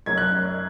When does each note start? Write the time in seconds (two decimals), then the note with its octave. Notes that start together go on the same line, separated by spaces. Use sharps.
0.06 F#1 F#2 F#3 G#6
0.18 F#6